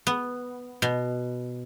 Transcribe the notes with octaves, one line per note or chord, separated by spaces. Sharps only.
B3
B2